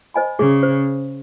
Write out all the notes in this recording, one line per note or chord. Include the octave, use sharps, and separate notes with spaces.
C5 D#5 G#5 B5
C#3 G#4
C5